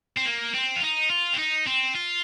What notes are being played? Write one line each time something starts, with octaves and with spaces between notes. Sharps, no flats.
C4
A#3
C4
F4
D#4
F4
C4
D#4
C4
F4